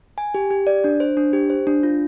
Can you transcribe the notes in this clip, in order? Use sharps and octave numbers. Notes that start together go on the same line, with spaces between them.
G#5
G4
G4
D5
D4
C5
D4
G4
C5
D4
F4